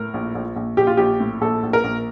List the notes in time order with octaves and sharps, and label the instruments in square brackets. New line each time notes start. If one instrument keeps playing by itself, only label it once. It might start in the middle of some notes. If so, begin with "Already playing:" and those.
Already playing: [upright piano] A2 A#4
A#1
A#1
A#1
A#1 G4
F4
A#1 G4
A2
A#1 A4
A#1
A#4
A#1